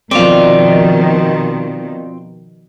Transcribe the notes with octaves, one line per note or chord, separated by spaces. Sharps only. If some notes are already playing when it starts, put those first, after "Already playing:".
B2 D#3 F3 C4 F4 D5